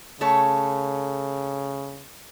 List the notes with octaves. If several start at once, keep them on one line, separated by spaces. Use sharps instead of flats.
C#3 A3 A4 C#5